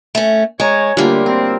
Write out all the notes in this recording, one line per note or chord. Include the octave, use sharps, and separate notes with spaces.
A3 C#4
G#3 C#5 G#5 A#5
D2 D3 G3 A#3 F4 G4
C4 A#4